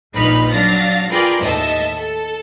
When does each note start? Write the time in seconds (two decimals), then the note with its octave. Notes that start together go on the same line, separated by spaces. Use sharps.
0.14 A#1 A#2 D#4 B4 B5 F6
0.49 F#3 D4 F5 A6 A#6
1.10 F4 G#4 A#4 B4 D5 G5
1.40 D#2 A2 D#5 E5 A5
1.95 A4